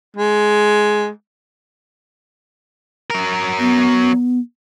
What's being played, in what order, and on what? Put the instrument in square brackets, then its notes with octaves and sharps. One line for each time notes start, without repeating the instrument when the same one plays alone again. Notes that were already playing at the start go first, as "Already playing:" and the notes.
[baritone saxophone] G#3
[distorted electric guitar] F#3 A#4
[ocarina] B3